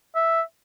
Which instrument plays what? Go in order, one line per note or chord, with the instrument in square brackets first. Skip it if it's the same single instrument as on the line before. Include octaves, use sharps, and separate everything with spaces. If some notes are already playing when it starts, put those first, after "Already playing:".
[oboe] E5